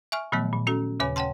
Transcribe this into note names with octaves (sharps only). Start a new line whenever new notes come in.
E5 G#5 C#6 F6
A#2 D#3 F3 F#3 A3 B3
A#2
C#4 F#4 A4
D#2 C#3 C#5 G#5 B5
C#5 F#5 G5 A5 C6